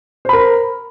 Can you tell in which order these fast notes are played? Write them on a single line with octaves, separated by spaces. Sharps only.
C5 B5 A#4